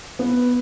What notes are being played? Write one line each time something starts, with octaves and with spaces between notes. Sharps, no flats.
B3